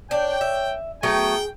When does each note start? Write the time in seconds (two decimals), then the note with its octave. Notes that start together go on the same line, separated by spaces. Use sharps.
0.11 D4 C#5 G5
0.41 E5
1.03 F#3 A3 B3 G#4 G5